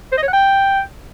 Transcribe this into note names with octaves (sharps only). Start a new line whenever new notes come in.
C5
D#5
C#5
F#5
G5